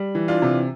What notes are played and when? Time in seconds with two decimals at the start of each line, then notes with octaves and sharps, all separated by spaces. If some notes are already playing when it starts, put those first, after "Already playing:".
Already playing: G3
0.15 E3
0.28 D4 F4
0.42 C3